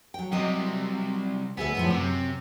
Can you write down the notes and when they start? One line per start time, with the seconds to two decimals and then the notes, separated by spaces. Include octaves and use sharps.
0.14 F#3 G5
0.32 C2 C3 F#3 D#5
1.57 D2 B3 G#4 E5
1.75 F#2 A2 F3
1.90 F#2 C3